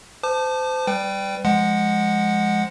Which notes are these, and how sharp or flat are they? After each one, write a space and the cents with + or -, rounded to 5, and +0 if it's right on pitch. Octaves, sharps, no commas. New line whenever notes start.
C5 -30 A5 +0 D6 +40
G3 +0 B4 +35 G5 +0
F3 +0 G#3 +0 F#5 +0